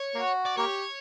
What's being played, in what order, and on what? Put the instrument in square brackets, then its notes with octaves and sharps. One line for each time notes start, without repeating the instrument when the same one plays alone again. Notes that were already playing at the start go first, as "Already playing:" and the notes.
Already playing: [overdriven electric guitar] C#5
[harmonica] A#3 F#4
[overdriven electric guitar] D5
[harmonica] A#3 G4 [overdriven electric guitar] C#5